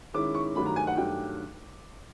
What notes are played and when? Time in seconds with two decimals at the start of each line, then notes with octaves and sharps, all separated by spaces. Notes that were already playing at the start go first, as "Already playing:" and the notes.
0.14 D#3 G#3 C#4 E4 D6
0.35 C#6
0.55 G2 D#3 F#3 A3 B5
0.66 A#5
0.76 G#5
0.87 F#5
0.97 G2 D#3 F#3 A3 G5